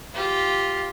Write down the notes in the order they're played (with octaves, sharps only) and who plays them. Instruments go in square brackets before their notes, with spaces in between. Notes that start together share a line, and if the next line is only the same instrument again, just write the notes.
[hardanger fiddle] F4 G4